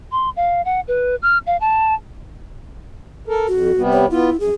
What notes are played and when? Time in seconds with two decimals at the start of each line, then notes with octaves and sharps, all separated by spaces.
0.12 C6
0.36 F5
0.65 F#5
0.88 B4
1.22 F6
1.47 F5
1.61 A5
3.28 A4 A#4
3.48 F2 F#4
3.77 C3 G3 B3
3.92 C#5
4.10 B3 E4 F4
4.40 F#2 G#4